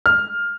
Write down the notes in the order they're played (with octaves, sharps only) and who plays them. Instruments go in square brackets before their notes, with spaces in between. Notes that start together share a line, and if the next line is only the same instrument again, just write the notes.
[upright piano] F6